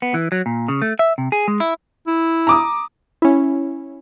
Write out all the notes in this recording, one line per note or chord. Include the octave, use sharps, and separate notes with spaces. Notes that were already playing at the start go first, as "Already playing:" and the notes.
B3
E3
F#3
A#2
C#3
A3
E5
C3
G#4
G#3
E4
E4
A#5 D6 D#6
C#4 E4